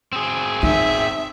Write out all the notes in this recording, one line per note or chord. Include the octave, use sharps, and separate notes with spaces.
C4 G#4
D#4 E5